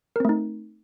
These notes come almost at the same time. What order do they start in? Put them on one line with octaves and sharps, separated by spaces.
A#4 C4 A3 D#4